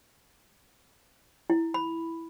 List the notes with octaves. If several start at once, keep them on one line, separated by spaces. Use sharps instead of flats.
E4
B5